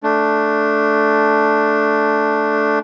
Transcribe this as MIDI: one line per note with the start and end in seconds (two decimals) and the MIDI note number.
0.03 2.79 57
0.03 2.79 62